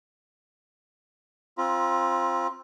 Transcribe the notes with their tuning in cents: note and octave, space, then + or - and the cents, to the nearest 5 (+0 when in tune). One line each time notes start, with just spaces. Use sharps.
C4 +15 F4 +0 A#5 +40